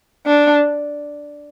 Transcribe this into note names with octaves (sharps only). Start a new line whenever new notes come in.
D4